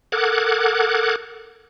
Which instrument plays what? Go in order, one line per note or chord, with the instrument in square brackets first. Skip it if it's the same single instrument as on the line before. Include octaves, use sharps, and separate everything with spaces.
[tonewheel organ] A4 A#4 F#5 D6 F#6 G#6